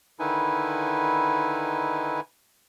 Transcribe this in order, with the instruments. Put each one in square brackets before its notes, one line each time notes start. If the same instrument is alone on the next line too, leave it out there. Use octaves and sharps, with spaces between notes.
[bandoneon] D3 D#3 D#4 E4 B4 G#5